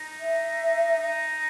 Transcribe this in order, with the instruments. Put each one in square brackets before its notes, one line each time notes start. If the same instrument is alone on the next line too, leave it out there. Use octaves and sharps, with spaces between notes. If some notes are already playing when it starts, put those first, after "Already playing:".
Already playing: [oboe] D#4
[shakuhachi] E5
[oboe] D#4